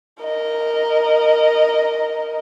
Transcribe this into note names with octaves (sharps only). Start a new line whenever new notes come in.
A#4 D#5